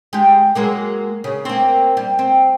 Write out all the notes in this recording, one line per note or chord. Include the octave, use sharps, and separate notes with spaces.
G#3 G4
F#3 G#3 A#3
C#3
A#3 C4
G3
C4